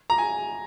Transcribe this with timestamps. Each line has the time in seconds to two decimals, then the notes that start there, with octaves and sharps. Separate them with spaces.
0.10 A#5
0.18 G#5